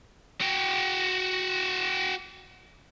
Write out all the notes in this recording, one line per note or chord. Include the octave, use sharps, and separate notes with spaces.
F#4 G5